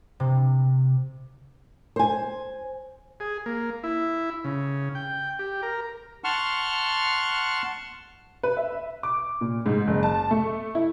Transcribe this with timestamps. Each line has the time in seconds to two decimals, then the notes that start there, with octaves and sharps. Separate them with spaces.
0.20 C3
1.96 C5 G#5
3.20 G#4
3.46 A#3
3.83 E4
4.44 C#3
4.95 G5
5.39 G4
5.63 A#4
6.24 F#5 A5 C6 C#6 F6
8.43 B4
8.57 E5
9.03 D6
9.41 A#2
9.66 G#2
9.87 F#1
10.03 A5
10.31 A3
10.75 E4